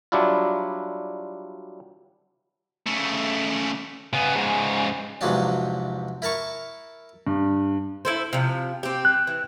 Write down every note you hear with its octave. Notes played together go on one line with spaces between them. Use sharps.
F#3 G3 D4 E4 F4
C#3 A3
C#3 B3 G#5
G#2 C#3
E2 G#2 C3 F3 F#3 D4
E4 A#4 A5 C#6
G2
E4 A4 C5
C3 F3
C4 G4
F#6
E3